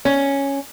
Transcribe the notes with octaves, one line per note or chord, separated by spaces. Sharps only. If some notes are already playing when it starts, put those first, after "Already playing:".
C#4